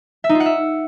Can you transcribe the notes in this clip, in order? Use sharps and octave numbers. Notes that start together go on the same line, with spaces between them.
E5
D#4
F4
F#5
E5